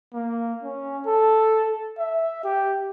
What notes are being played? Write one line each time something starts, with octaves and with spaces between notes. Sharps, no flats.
A#3
C#4
A4
E5
G4